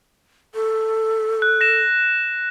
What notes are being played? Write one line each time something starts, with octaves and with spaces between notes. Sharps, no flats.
A4
F#6
A#6 E7